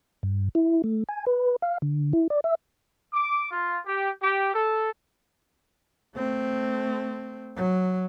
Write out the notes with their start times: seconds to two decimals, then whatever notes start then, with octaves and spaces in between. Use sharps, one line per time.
0.23 G2
0.55 E4
0.84 A3
1.09 G#5
1.26 B4
1.62 F5
1.82 D3
2.13 E4
2.30 D5
2.44 E5
3.13 D6
3.50 F4
3.86 G4
4.21 G4
4.53 A4
6.16 A3 C4
7.56 F#3